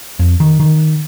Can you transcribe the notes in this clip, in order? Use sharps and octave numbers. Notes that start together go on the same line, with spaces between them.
F2
D#3
D#3